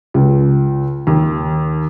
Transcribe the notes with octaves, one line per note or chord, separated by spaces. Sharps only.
C#2
D#2